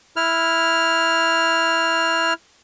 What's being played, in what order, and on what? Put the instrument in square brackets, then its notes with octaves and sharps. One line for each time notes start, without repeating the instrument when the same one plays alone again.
[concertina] E4 F6